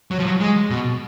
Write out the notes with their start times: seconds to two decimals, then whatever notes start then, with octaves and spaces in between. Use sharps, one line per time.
0.11 F#3
0.19 F3
0.27 F#3
0.40 G#3
0.70 B2